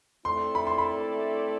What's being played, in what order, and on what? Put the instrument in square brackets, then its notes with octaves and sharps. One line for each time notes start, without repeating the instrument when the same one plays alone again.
[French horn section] A3 C4 E4 A4 D5 [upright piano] C6
[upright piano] B5
C6
B5